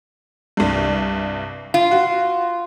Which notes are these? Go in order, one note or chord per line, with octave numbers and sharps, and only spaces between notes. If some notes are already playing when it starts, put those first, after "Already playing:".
C2 G2
F4
F#4